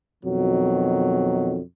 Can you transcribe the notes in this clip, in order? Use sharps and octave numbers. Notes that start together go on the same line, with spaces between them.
F2 B2 D#3 F#3